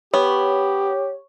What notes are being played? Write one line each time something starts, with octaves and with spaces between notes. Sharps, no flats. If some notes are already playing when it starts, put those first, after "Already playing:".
B3 G4 C#5